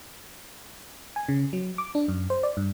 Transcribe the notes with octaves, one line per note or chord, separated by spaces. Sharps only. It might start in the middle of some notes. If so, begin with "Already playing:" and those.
G#5
C#3
F#3
D6
D4
F#2
C5
D5
G2